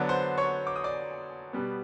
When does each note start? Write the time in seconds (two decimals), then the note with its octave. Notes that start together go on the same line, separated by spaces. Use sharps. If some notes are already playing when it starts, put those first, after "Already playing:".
Already playing: D3 F#3 B3 D5
0.09 C5 C6
0.38 C#5 C#6
0.67 D6
0.76 D#6
0.84 D5 D6
1.53 B2 G3 B3